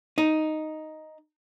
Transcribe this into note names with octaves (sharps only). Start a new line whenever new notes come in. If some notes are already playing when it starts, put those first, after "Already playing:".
D#4